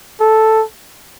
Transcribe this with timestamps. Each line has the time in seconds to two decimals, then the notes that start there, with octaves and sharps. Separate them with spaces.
0.21 A4